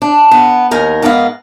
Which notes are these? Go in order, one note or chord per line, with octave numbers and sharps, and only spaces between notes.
D4
B3
D#2 D#4 A#4 G#5
G#2 B3 A#4 B4 D#5 F5